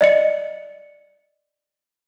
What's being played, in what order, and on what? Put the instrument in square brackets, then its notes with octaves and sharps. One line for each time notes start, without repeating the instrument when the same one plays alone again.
[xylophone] D5 D#5 C#7